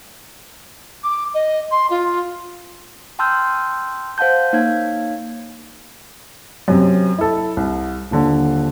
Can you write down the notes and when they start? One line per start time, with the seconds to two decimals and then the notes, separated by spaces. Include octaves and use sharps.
1.04 D6
1.34 D#5
1.71 C6
1.90 F4
3.19 G5 A5 C6 E6 F6 G6
4.18 C5 F5 F#5 A5 G6
4.53 A#3 D#4 C#5 F5 G#6
6.68 F#2 C3
7.18 E4 A4
7.57 C2
8.11 D#1 D3